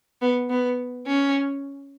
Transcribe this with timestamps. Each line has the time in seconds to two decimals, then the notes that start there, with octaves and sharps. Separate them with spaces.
0.22 B3
0.50 B3
1.07 C#4